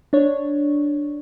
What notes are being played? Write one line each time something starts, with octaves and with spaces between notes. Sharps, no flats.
D4 C#5